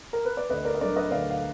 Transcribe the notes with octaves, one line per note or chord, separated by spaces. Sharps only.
A#4
B4
D5
D2 B4 D#5
A#4 D5
D#5
D3 F#3 A#4 D5
B4 D#5
D2 D5 F5
F5